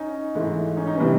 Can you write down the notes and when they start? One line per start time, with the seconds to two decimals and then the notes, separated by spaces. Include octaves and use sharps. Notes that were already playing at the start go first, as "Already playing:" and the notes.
Already playing: C#4 D#4
0.35 G#2 E3 A3
0.77 C#4 D#4
0.87 C#4 D#4
0.97 C3 E3 G3 B3